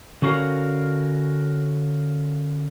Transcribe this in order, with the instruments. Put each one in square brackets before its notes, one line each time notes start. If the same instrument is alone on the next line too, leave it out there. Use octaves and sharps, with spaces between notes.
[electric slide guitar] D3 C#4 F#4 A#4 F5